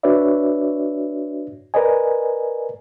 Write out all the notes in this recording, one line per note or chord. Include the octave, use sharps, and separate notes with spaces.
D4 F#4 B4 C#5 D5 E5
A#4 B4 D5 D#5 G#5